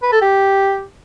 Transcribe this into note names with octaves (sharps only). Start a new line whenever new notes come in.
B4
A4
G4